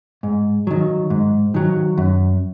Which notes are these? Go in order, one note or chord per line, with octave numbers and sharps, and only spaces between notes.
G#2
D#3 F#3
G#2
D#3 F#3
F#2